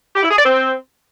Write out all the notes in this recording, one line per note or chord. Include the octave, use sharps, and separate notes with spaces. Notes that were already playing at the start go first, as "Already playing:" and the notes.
G4
E4
G#4
D5
C4